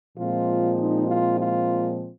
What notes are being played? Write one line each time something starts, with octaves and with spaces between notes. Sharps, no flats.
A#2 F3 G#3 C4 F4
D#4
F4
F4